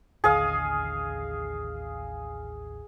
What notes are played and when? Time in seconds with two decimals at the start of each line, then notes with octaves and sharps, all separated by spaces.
0.24 A1 D#2 D3 G#4 D#5 F5